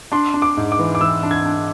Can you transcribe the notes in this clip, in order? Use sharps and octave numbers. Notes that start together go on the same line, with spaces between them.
D4 C6
D4
D6
G#2
D6
E3
D6
E3 E6
D4
G#6
D4